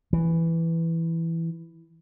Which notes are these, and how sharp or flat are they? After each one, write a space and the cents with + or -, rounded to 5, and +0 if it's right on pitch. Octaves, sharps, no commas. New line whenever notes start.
E3 +5